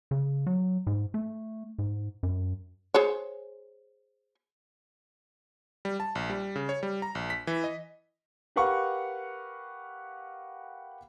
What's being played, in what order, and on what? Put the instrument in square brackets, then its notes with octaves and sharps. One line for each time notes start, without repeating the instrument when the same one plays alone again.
[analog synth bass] C#3
F#3
G#2
A3
G#2
F#2
[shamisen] G#4 C5 C#5
[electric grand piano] G3
A5
A#1
G3
C#3
C#5
G3
A#5
A#1
B6
E3
D#5
[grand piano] G4 A#4 B4 F5 F#5 C#6